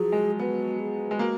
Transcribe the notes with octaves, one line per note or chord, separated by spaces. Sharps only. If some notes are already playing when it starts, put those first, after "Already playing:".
Already playing: F3 F#3 G#4
G#3
B3 F#4
G#4
G#3
A#3 F#4